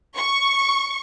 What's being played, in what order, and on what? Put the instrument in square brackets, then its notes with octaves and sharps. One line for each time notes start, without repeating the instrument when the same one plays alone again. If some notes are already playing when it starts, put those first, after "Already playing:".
[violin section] C#6